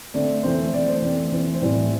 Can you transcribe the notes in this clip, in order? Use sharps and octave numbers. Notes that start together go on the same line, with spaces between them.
D3 A3 C4 D5
E3 A3 C4 C5
E3 A3 C4 D5
C5
E3 A3 C4 D5
E3 A3 C4
C5
A2 E3 G3 C4 D5